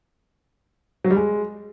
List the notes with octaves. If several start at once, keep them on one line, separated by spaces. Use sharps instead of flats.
F#3
G3
G#3